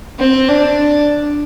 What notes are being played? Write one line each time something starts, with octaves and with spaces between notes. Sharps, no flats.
C4
D4